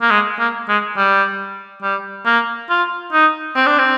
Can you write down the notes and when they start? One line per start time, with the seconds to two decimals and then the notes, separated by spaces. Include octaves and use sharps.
0.02 A#3
0.10 G#3
0.39 A#3
0.69 G#3
0.97 G3
1.82 G3
2.25 A#3
2.70 F4
3.13 D#4
3.56 C4
3.66 D4
3.78 C4